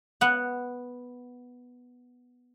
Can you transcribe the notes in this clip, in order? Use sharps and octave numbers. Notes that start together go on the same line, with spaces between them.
B3 F#5